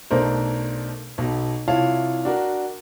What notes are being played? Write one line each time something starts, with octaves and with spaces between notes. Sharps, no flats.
B1 A3 D4 A#4 C5
B1 B2
C2 E4 F4 C#5 F5 A5
D4 F#4 A#4